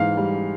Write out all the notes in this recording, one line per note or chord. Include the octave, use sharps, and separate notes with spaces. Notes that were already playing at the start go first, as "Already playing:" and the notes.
Already playing: G#2 E3 F5
G3